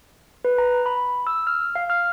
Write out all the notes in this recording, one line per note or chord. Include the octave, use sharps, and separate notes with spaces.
B4
A#5
B5
E6
F6
F5
F6